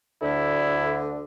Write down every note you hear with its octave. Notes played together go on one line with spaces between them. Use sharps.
D2 D3 E4